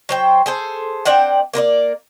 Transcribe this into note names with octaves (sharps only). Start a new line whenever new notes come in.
F#3 C5 G5
G#4 A4 C5
C4 D4 F#5 G5
A#3 A#4 B4 D5